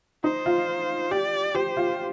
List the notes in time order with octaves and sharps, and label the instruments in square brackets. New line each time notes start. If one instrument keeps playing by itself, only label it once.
[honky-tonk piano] D#4 [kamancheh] C5
[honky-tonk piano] F4
[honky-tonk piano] G4 [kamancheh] D5
[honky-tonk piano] G4 [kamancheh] C5
[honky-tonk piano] F4